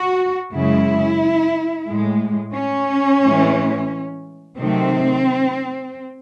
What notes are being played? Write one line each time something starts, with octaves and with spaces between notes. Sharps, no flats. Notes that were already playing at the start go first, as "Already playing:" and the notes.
Already playing: F#4
F#2 C#3 G#3 E4
A2 G#3
C#4
A2 E3 G#3
C3 D#3 F#3 A3 C4